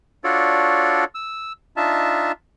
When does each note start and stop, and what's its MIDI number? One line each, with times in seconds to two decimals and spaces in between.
0.24 1.04 62
0.24 1.04 65
0.24 1.04 66
0.24 1.04 69
0.24 1.04 73
0.24 1.04 74
1.15 1.53 88
1.77 2.32 62
1.77 2.32 63
1.77 2.32 65
1.77 2.32 76
1.77 2.32 81